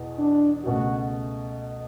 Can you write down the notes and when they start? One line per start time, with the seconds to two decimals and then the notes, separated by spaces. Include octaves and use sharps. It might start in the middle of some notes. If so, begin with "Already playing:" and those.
Already playing: E2 B2
0.18 D4
0.65 C#2 B2 A3 F#4